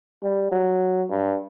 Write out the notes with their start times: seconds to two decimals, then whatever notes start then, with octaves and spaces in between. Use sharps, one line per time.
0.23 G3
0.52 F#3
1.10 G2